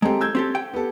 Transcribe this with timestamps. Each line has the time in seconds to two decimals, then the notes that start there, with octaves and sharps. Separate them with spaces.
0.02 G#3 C4 G4 A4 A#5
0.21 E6 G6 G#6
0.35 C4 G4 A4
0.55 G5
0.74 B3 G4 A4